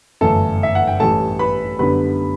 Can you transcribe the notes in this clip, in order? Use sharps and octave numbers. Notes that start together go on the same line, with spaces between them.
G1 F#2 E3 A3 A4 A5
E5
F#5
G5
A1 A2 E3 G3 A4 A5
B4 B5
F#2 D3 G3 B3 B4 B5